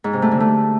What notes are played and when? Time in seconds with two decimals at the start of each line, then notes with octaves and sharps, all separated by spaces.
0.04 G#2
0.13 C3
0.22 A3
0.31 D3
0.40 A3